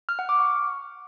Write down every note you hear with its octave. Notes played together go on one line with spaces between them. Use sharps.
F6
F#5
D6
C#6